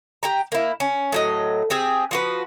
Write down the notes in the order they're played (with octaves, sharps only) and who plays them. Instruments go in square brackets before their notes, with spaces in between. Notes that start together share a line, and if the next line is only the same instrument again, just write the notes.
[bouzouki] G4 G5 A#5
A#3 E4
C#4
A2 F#3 D#5
C4 G4 G#4
F3 F#4 B4